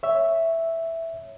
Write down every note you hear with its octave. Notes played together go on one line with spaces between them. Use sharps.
C#5 E5